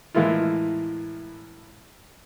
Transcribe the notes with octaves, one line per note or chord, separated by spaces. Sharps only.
A2 E3 G#3 A#3 E4 F4